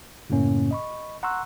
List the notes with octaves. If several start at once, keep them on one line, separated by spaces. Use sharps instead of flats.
F#2 A2 C#3 A#3 C#4
D#5 B5 C#6
F#5 A#5 C6 C#6 E6 F#6